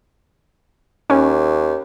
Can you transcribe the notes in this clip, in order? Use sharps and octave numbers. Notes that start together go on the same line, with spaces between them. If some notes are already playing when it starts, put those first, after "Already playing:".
D#2 C#4